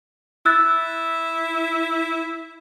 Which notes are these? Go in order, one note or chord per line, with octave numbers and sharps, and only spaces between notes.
E4 E6 F#6 A6